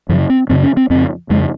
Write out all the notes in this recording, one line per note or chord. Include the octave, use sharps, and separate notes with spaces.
F#2 C#3 F3
C4
F#2 C#3 C4
C#4
C4
F2 C#3 C4
F2 C#3 G#3